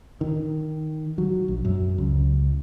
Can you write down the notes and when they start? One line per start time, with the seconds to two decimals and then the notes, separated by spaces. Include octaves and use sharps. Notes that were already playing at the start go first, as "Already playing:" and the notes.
0.21 D#3
1.18 F#3
1.48 A#1
1.65 F#2
1.98 C#2